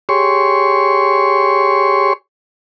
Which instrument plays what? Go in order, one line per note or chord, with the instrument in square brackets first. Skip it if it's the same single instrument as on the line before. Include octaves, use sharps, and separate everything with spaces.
[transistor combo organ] G4 G#4 C#5 C6 C#6